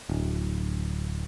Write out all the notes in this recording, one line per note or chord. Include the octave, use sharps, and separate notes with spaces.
D1